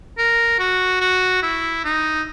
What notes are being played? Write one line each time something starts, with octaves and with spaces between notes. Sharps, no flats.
A#4
F#4
F#4
E4
D#4